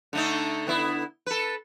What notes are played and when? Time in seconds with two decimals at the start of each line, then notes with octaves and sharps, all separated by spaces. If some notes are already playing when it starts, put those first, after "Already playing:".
0.13 D3 A3 D#4
0.67 D3 B3 E4
1.26 A4 B4